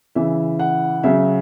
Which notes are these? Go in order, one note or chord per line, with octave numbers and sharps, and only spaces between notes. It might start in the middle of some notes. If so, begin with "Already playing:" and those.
C#3 E3 E5
F#5
C#3 F#3 E5